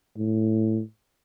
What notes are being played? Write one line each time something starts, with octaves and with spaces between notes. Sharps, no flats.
A2